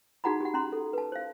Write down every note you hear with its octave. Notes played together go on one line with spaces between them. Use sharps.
D#4 F#4 G#4 F#5 A#5 B5
G4 F#5
C#4 A#5 C6
A4
B4 A5
C5 F5